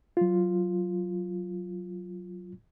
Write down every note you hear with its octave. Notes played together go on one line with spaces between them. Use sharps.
F#3 F4